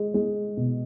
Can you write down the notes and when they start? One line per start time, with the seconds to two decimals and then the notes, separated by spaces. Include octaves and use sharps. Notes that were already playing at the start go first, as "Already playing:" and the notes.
Already playing: G#3
0.14 G#3
0.57 B2